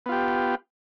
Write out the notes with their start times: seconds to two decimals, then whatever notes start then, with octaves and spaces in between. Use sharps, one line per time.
0.06 B3
0.09 F4
0.12 G4